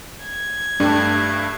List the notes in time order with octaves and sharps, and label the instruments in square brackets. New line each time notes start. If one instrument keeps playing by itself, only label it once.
[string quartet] G#6
[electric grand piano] G2 A3 [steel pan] D4 G4